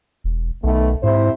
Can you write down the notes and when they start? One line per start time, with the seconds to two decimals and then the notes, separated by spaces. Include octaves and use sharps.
0.24 E1
0.64 B1 D#3 A3 B3
1.03 G#2 C3 E4 C5